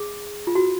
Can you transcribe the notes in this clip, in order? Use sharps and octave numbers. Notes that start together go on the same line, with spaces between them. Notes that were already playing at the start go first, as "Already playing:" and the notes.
Already playing: G#4
F4
F#4